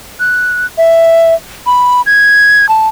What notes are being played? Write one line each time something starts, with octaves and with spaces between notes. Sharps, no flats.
F#6
E5
B5
G#6
A5